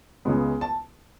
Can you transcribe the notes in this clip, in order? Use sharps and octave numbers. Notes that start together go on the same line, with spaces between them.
C#2 C#3 G#3 B3
A5